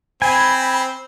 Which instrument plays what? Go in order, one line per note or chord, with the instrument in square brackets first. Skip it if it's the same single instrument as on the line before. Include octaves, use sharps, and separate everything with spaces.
[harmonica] C4 [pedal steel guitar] G#5 [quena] B5